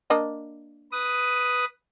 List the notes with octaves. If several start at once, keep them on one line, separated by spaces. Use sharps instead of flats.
A#3 D4 D#5
B4 D#6